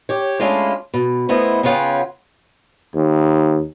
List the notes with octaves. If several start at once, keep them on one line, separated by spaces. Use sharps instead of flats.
G4 C#5
G#3 A3 C#4 D4 E4 F4
B2
A3 B3 E4 C5 D#5
C#3 B3 C#4 F4 F#5 G5
D#2